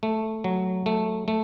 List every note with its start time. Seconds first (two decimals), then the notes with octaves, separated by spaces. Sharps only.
0.03 A3
0.44 F#3
0.86 A3
1.28 A3